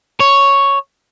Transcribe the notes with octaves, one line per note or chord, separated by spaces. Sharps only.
C#5